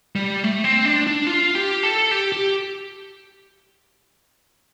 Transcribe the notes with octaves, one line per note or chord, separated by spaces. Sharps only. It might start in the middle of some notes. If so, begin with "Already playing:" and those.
G3
A3
C4
D4
D4
F4
G4
A4
G4
G4